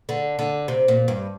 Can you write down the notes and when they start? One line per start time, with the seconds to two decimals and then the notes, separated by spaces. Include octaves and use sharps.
0.09 D3
0.39 D3
0.68 C3
0.88 A#2
1.08 G2